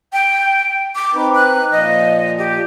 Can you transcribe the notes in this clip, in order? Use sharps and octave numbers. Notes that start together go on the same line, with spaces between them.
G5
D6
C4 D#4 B4
F#6
A#2 F3 D#5
G4